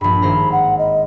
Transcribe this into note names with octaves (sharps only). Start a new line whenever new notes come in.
A#1 G2 B5
G#1 C5 A#5
F#5
D#5